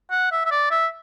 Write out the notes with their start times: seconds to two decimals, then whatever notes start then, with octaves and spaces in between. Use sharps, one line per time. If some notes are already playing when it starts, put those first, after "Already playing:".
0.11 F#5
0.32 E5
0.46 E5
0.51 D5
0.71 E5